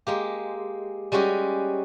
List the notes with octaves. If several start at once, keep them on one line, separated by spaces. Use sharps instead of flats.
G#3 A#3 G4
G3 G#3 C#4 F#4 G4